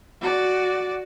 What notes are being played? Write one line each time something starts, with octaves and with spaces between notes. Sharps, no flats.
F#4 D5